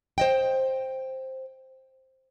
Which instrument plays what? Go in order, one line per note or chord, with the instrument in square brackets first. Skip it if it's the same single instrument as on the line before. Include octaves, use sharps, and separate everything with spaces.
[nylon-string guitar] C5 D#5 G5